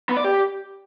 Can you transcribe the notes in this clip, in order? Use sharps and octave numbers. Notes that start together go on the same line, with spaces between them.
B3
D5
G4